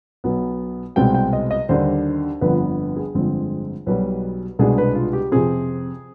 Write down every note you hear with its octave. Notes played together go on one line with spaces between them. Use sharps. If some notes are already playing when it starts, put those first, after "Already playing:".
B1 B2 B3
C2 B2 G#3 C4 G5
G5
D#5
D#5
D#2 D3 G3 D4 C5
G1 F2 D3 F3 B3 B4
G#4
G1 F2 D3 G#3 C4
B1 B2 G3 B4
C2 B2 G#3 B3 D4 G#4
B4
F4
G4
F2 C3 F3 C4 G#4